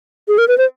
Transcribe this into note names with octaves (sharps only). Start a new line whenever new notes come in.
G#4
A#4
B4
C5